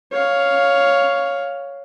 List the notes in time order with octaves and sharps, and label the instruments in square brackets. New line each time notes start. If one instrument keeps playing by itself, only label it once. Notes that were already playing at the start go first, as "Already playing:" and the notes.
[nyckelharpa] C#5 F5